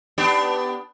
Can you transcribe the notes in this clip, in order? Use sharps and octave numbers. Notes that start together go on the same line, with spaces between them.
B3 D4 G4